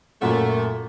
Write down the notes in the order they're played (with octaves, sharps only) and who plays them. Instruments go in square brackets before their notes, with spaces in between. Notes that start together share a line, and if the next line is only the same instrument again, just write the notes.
[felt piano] F#2 A#2 F#5 [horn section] A3